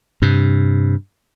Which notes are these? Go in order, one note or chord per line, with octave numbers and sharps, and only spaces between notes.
G2 C3